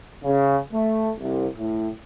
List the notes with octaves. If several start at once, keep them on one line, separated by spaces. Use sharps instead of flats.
C#3
A3
C2
A2